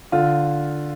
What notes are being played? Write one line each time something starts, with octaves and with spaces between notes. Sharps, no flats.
D3 F4